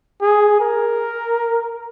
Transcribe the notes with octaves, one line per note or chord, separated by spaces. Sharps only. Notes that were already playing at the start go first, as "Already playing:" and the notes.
G#4
A#4